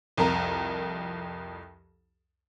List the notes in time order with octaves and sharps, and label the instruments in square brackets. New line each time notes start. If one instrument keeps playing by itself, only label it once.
[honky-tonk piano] C2 F2 A#4 A#5